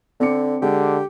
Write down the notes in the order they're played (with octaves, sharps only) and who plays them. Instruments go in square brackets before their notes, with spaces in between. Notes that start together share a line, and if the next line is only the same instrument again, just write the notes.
[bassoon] D3 [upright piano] C4 D6 C#7
[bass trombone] D3 [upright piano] G#3 [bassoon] G4